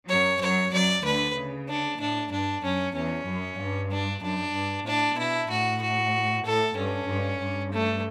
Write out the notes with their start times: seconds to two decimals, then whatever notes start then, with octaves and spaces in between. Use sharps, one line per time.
0.09 F#2 F#3 C#5
0.41 F#2 F#3 C#5
0.72 F#2 F#3 D5
1.04 D2 D3 B4
1.36 C#3
1.68 D4
2.00 A2 D4
2.31 G2 D4
2.63 F#2 C#4
2.95 E2 C#4
3.27 F#2
3.59 G2
3.91 D4
4.22 F#2 D4
4.54 G2
4.86 A2 D4
5.17 B2 E4
5.50 A2 F#4
5.82 F#4
6.45 A2 A4
6.77 G2 C#4
7.08 G2
7.41 G2
7.73 A3